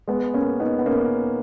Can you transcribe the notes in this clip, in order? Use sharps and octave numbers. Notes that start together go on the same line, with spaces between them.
G#3 B3
A#3 C#4
B3 D#4
B3
A#3 C#4